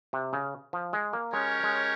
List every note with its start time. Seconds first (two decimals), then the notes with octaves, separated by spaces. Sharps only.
0.13 C3
0.33 C#3
0.73 F3
0.93 G#3
1.13 A#3
1.33 G#3 C#4 G4 A#4 C#5
1.63 G#3